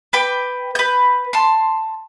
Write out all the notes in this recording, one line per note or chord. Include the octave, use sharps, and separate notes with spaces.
B4 G5 D6
B4 G6
A5 C6